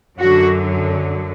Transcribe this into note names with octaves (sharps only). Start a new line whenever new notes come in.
F#2 D3 F#3 F#4